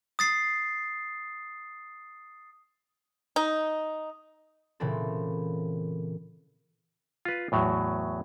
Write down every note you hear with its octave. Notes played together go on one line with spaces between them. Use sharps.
D#6 A6 C7
D#4
A#2 C#3 E3 C4 A4
F4 B4
E2 A2 F#3